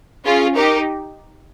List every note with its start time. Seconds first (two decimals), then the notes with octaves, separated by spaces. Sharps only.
0.25 C#4 F4 G#4
0.55 D#4 G4 A#4